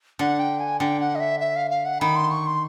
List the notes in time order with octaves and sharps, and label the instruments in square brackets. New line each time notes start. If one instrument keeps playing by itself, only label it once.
[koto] D3 [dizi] F#5
[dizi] G5
G#5
[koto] D3 [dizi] G5
[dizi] F#5
D#5
E5
E5
F5
F5
F#5
[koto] D#3 [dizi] B5
[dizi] C6
C#6
C6